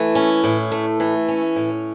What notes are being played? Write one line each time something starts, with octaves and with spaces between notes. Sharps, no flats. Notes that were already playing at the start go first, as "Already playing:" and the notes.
Already playing: E3 A3
C#4
A2
A3
E3
C#4
A2